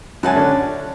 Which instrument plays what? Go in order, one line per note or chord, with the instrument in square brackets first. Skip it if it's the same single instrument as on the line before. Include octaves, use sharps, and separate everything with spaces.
[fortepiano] F#2 G#5 [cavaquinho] E5 F#5 A5
[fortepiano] D3 C#4